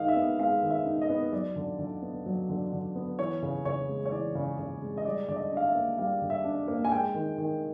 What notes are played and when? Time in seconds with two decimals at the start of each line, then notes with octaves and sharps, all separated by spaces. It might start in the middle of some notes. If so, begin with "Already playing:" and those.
Already playing: D#3 G#3 D#4 F5
0.08 E5
0.16 B3
0.39 G#3 F5
0.63 D#3
0.70 E5
0.86 D#4
1.02 D#5
1.10 B3
1.32 F#3 D5
1.56 D3
1.79 D3
2.02 B3
2.26 F#3
2.49 D3
2.73 D3
2.95 B3
3.19 E3 C#5
3.42 C#3
3.65 C#3 C#5
3.89 G#3
4.06 C#5
4.12 E3 D5
4.35 C#3
4.59 C#3
4.82 G#3
4.97 D#5
5.05 G3 D5
5.28 D3 D5
5.36 D#5
5.52 D4 F5
5.67 E5
5.75 A#3
5.98 G3 F5
6.22 D3
6.30 E5
6.45 D4
6.68 A#3
6.85 G#5
6.92 G#3 G5
7.15 D#3
7.38 D#3